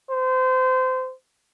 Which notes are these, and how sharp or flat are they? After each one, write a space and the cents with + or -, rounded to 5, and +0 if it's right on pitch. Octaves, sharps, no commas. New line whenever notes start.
C5 -25